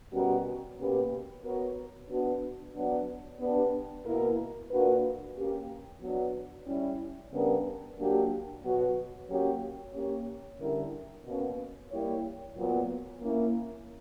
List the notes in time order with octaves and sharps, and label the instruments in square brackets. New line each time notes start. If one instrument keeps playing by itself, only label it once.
[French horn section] B2 G3 C#4 F#4 A#4
B2 A#3 C#4 G4 B4
B3 F#4 A#4 C#5
B3 D4 F#4
F#3 B3 D4
B3 D4 G4
B2 A#3 E4 A#4
A#2 A#3 D4 F#4 B4
A#3 C#4 G4
F#3 B3 D4
G3 C#4 E4
C#3 G3 B3 D4 A#4
F#3 A#3 D4 G4
B2 F#3 B3 F#4
F#3 A#3 C#4 G4 C#5
A#3 C#4 G4 C#5
D3 G3 C#4 E4 A#4
B2 A#3 C#4
G3 A#3 E4 G4 C#5
A#2 F#3 B3
A#3 C#4 E4